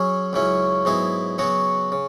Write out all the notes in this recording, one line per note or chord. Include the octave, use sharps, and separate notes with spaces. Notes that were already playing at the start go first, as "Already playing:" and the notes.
Already playing: F#3 C#4 G#4
C#2 C#3 F#3 C#4 E4
G#2 F#3 B3 E4 G#4
C#3 F#3 B3 F#4 C#5
C#3